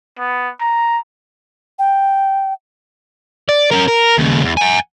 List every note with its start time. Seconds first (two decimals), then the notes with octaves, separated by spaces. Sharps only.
0.19 B3
0.60 A#5
1.79 G5
3.49 D5
3.71 C#4 A#4
3.88 A#4
4.18 D#2 C#3
4.43 E2
4.57 F#5 G#5